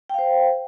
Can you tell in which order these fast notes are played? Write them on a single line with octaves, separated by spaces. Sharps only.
G5 F5 C5